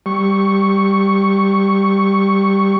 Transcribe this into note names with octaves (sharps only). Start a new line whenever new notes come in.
G3 C#6